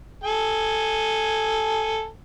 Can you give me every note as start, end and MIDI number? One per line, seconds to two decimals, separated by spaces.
0.24 2.06 69
0.24 2.06 80